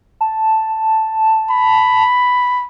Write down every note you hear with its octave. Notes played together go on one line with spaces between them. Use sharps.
A5
B5